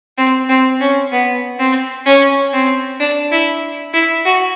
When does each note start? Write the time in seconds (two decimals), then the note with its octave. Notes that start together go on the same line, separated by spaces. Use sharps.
0.18 C4
0.49 C4
0.80 C#4
1.12 B3
1.59 C4
2.06 C#4
2.53 C4
3.00 D4
3.31 E4
3.93 E4
4.25 F#4